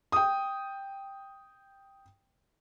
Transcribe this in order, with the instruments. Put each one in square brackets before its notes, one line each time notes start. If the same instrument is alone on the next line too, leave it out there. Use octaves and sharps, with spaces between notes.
[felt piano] G5 D#6